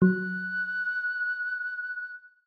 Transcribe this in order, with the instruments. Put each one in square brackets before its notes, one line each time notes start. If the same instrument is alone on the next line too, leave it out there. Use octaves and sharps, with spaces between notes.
[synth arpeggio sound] F#3 [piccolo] F#6